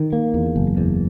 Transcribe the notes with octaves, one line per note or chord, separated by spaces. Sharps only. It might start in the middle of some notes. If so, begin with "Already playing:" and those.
Already playing: D#3
A#3
E2
F#1
E2